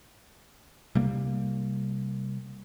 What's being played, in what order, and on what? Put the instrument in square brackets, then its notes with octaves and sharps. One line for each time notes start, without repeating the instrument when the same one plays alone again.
[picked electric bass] C3 G3 A#3